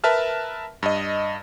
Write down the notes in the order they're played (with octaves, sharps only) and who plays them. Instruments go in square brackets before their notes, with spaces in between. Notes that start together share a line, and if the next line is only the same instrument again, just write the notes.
[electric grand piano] A#4 B4 E5 A5 F6
G2 D#5